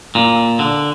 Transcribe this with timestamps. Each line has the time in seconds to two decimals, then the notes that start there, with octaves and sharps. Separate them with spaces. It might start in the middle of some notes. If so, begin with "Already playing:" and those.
0.15 A#2
0.59 D3